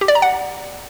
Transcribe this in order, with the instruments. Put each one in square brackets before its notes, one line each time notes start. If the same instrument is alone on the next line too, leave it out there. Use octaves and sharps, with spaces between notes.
[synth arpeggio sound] G4
D5
A#5
F#5